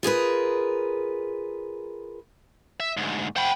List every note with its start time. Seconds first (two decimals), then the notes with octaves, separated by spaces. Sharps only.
0.03 F4 G#4 A#4 B4
2.80 E5
2.97 D2 G#2
3.36 C5 F#5 G5 B5